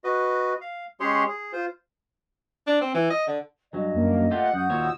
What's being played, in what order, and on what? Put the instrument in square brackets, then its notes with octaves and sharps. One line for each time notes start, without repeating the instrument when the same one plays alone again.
[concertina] F#4 B4 D#5
F5
G#3 C#4 G4 G#4 C#5 C6
G#4
F4 C5
[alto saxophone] D4
C4
E3
D#5
D3
[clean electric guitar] G2 F#3 [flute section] D#5
[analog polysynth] F#2 A#3
[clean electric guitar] A3 F4 G4 [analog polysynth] F#5
[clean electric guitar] F#2 [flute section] F#4 D#6 G6
[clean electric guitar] D#2 A#2 C#5 [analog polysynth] E6